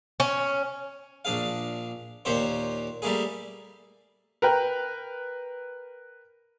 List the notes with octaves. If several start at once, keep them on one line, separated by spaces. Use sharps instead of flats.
C#4
A#1 D4 G#4 F5
D#2 A#2 G4 C5 C#5
G3 A3 A#3 G#4
A#4 B4 G5